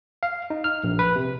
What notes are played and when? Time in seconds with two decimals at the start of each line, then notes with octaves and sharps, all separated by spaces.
0.23 F5
0.50 D#4
0.64 F6
0.84 A#1
0.99 B4
1.16 C3